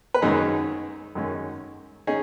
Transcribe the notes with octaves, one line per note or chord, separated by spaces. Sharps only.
B4
F#2 D#3 G#3 C#4 D#4 G#4
F#2 D#3 G#3 C#4
C#4 D#4 G#4